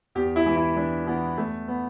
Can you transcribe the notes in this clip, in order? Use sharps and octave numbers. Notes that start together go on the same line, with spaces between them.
E2 G4
E4
E3
E4
E3 D4
E3 B3
E2 A3
B3